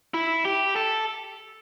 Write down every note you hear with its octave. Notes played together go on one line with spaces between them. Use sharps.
E4
G4
A4